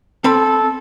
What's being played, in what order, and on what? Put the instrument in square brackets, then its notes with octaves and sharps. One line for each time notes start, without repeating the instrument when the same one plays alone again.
[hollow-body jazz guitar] C4 B5 [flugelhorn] A4